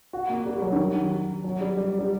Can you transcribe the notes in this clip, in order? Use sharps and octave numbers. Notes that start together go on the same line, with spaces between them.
F#4
A#3
G3
G3
F#3
D#3
F#3
F#3
G3
G3
G3